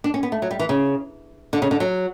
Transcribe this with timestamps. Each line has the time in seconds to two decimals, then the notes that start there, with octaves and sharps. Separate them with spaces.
0.04 D4
0.14 C#4
0.23 B3
0.32 A3
0.42 F#3
0.51 G3
0.59 E3
0.69 C#3
1.53 D3
1.62 C#3
1.71 D3
1.80 F#3